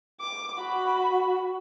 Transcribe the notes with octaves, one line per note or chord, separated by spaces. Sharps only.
D6
F#4 B5